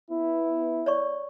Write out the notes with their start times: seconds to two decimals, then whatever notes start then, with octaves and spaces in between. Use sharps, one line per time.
0.10 B3 E4
0.86 C#5 D5 C#6